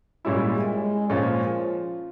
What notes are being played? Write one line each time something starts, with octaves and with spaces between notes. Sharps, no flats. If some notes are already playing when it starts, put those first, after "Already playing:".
A#2 G3 G#3 C#4 E4
G#3
G#3
A#2 F3 G#3 C#4 F4